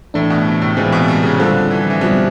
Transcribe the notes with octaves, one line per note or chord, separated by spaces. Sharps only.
A2 E3 A3 D4
B2
C3
A2
A#2 E3 G#3 C4
B2
C3
C#3
D3 G3 C4 F4 A4
E3
F3
E3
B2 F3 G3 C4